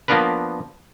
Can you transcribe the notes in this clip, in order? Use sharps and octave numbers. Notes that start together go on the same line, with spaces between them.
F3 A#3 B3 D4 A#4 B4